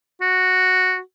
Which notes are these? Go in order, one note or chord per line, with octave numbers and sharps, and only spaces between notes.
F#4